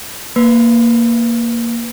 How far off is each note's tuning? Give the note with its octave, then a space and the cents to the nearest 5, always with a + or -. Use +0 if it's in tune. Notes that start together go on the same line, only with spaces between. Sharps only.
A#3 +0 B4 +5